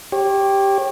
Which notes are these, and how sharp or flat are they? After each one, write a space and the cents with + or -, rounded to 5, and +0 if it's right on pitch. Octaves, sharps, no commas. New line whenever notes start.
G4 +0 C#5 -30